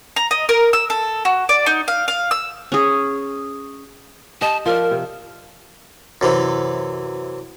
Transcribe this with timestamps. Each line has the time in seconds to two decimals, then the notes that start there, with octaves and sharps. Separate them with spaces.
0.16 A#5
0.31 D#5
0.49 A#4
0.73 E6
0.90 A4
1.25 F#4
1.49 D5
1.66 D#4
1.88 F5
2.08 F5
2.31 E6
2.72 C#4 G#4
4.41 G4 D#5 G5 A5
4.66 F3 A#4 D5
4.91 C3
6.21 F#2 C3 E3